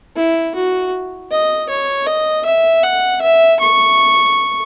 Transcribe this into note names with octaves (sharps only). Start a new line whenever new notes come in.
E4
F#4
D#5
C#5
D#5
E5
F#5
E5
C#6